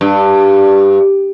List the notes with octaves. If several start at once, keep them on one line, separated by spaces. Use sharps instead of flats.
G2